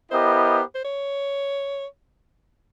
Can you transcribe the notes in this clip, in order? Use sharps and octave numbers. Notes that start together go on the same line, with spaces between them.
B3 E4 G4 A#4 C5 D#5
C5
C#5